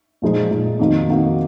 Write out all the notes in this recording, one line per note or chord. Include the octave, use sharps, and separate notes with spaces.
A#2 F3 G#3 D#4
A#2 F3 G#3 D#4
F2 D#3 A#3 D#4 F#4
F2 D#3 A#3 D#4 F#4